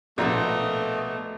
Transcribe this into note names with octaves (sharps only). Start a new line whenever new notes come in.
A#1 B2 A3 F#4 A4 A#4 D#5